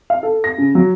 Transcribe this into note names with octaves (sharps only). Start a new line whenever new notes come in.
F5
A4
A#6
C#3
F#3